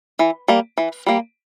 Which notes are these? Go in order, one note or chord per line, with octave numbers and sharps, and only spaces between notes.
E3
G3 A#3
E3
G3 A#3